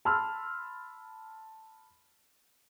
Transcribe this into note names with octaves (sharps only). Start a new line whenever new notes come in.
A5 B5 C6 E6 F6